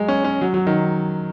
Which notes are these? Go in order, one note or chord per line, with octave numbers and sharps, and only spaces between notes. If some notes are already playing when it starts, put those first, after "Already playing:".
Already playing: F#3 G#3
C#4
C#4
F#3
F#3
D#3